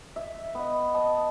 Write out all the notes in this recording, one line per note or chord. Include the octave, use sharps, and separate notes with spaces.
E5
B3 D#5
D#5 A5